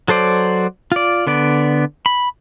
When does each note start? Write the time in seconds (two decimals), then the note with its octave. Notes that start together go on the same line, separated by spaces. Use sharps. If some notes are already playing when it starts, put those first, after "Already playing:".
0.08 F#3 A4 C5 D5
0.92 F4 D5
1.27 D3 B3 D5
2.06 B5